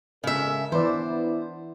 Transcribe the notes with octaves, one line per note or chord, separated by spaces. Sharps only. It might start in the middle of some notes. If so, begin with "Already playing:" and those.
C#3 G#3 A4 A#4 E5
E3 B3 D4 E4 B4 C5 D5